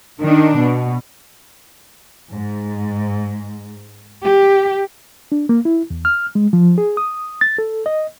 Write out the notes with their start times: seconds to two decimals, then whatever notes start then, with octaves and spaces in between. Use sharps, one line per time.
0.21 D#3 D4
0.58 B2
2.30 G#2
4.25 G4
5.32 D4
5.49 A#3
5.65 E4
5.91 E2
6.05 F6
6.35 G#3
6.53 F3
6.78 G#4
6.97 D#6
7.41 A6
7.58 A4
7.86 D#5